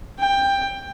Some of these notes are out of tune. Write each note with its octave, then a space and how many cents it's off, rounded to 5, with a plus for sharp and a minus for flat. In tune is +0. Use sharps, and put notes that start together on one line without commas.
G5 +15